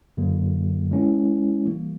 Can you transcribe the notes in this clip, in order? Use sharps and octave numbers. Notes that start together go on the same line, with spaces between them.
F#2 D3 F#3 A#3
G#3 C#4 E4
E3 G3 A#3